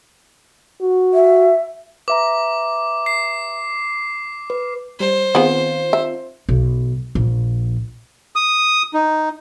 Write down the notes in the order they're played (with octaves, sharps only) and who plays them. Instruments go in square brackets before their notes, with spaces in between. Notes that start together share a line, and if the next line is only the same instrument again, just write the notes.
[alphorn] F#4
[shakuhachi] E5
[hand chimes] B4 E5 A#5 [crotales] D6
[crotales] C7
[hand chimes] B4
[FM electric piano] G3 [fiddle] C5
[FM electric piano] D#3 C4 F4 [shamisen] B3 G#4
[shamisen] E5
[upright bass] B1
A#1
[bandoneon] D#6
D#4